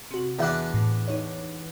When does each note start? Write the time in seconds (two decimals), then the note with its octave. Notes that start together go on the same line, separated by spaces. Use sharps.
0.11 C3 F#4
0.39 E2 D4 D5 E5 F#6
0.74 A2
1.08 D#4 C#5